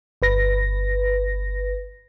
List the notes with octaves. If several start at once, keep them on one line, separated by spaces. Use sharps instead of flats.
G1 B4 A#6